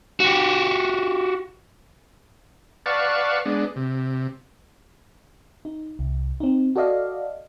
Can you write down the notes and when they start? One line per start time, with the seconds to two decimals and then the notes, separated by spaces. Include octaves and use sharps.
0.20 F#4 G4
2.86 B4 D5 F5 F#5 A5 C#6
3.45 G#3 B3 D4
3.76 C3
5.65 D#4
5.99 C2
6.40 C4 D#4
6.76 F#4 A4 D5 D#5 F5